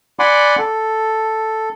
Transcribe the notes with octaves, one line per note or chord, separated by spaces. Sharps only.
D5 F#5 G#5 B5 C6 D6
A4